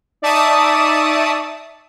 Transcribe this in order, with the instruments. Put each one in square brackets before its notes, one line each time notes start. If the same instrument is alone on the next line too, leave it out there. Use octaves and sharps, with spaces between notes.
[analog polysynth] D#4 D5 E5 A5 C#6 D#6